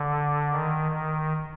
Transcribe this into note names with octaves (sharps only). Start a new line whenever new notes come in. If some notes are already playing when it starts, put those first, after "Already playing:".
Already playing: D3
D#3
D#3